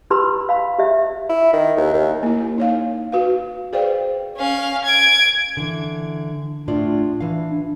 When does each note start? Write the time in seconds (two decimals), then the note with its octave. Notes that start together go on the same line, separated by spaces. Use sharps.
0.10 E4 G4 B4 B5 C6 E6
0.49 F5 B5
0.79 G4 E5
1.29 E4
1.53 D#3
1.77 D#2
1.94 D#2
2.23 A#3 E4
2.58 D#4 C#5 F5
3.12 F#4 B4 F5
3.73 G#4 B4 C5 D5 F5 G5
4.37 C#4 F5
4.85 G#6 D7
5.57 D3 E3
6.68 A2 D4 F4 D5
7.21 E3 F5